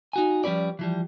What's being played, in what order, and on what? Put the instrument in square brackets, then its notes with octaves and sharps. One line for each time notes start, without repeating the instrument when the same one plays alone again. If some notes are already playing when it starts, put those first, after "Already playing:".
[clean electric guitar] D#4 F#4 G#5
F3 G3 C#4 B4 D5
E3 F3 G3